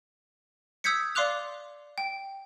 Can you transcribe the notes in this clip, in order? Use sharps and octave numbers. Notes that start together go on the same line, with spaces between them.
D#6 E6 G6 G#6 B6 C#7
D5 F5 C6 D6 F#6 F7
G5